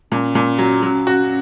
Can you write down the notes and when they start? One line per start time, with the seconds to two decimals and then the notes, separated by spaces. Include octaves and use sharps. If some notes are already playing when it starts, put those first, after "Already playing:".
0.12 A#2 C#4
0.35 A#2
0.58 F#3
0.83 F#3
1.07 F#4